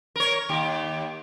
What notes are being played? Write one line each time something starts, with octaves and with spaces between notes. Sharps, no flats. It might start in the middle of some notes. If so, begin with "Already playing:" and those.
A#4 C#5
D#2 G4